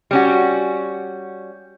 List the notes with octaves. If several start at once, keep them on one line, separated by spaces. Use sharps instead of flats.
G3 C#4 F#4